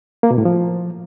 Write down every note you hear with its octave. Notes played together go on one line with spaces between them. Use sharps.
A#3
B2
A2
F3